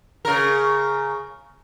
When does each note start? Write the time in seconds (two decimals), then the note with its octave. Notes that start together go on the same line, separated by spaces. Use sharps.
0.25 C#3 A#4